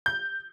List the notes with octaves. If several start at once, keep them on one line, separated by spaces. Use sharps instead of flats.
G6